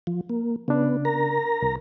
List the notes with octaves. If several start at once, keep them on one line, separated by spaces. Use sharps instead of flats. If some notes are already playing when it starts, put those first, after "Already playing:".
F3
A#3
C#3 B3 D4
A#4 A#5
C2